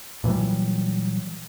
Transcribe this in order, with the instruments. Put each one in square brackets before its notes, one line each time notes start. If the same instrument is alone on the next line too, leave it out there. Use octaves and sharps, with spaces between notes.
[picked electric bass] A#2 E3 F#3 G3